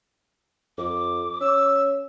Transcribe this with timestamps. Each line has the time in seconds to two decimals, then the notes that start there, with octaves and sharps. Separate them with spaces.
0.78 F2 D6
1.41 C#4 E6